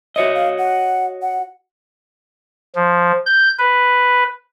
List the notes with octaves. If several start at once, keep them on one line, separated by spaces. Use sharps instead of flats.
F#4 C#5 D#5 E5
F5
F#5
F#5
F3
G6
B4